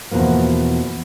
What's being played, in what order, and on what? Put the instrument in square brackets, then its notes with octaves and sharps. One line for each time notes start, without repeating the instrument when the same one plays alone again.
[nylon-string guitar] E2 G#2 B2 F3 A#3